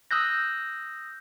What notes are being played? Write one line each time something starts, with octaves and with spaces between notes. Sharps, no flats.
D#6 E6 F#6 G6 A#6